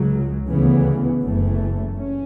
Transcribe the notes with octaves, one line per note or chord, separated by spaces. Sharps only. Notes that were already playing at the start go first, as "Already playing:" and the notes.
Already playing: C#2 C#3 F#3
D2 C#3 E3 B3
F#1 F#2 E3 A3
C#4